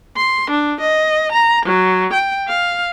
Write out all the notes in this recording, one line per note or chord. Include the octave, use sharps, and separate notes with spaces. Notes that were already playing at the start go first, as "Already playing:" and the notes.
C6
D4
D#5
A#5
F#3
G5
F5